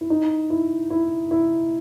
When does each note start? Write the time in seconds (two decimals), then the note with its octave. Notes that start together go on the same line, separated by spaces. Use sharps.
0.01 E4
0.10 D#4
0.50 E4
0.90 E4
1.31 E4